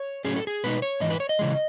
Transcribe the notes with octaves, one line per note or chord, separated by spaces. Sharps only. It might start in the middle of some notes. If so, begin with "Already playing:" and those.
Already playing: C#5
A2 F#3 C#4 G#4
A4
G#4
B2 G#3 B3 D#4 B4
C#5
G#2 E3 D#5
B4
C#5
D#5
C#3 E3 G#3